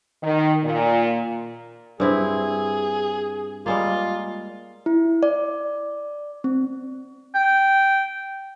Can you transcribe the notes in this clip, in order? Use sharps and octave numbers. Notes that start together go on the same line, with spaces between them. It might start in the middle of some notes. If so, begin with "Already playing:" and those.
D#3
A#2
G2 C4 E4 G#4
G3 G#3 A#3 F4
E4
D5
C4
G5